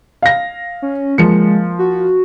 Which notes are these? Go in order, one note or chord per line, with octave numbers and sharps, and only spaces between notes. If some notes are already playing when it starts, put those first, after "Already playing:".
F5 A#6
C#4
F3 G#3 A#3 C#7
F#4